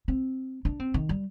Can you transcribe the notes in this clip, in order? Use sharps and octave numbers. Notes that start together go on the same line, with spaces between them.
C4
D4
C4
D#3
G3